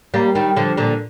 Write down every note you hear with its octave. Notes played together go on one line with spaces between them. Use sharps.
G3 A#3
D#3 G3
D3 F3
A#2 D3